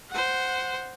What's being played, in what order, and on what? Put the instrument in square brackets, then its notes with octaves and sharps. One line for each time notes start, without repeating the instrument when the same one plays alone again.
[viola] C5 F#5